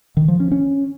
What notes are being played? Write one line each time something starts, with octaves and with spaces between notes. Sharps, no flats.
D#3
F3
C#4
C#4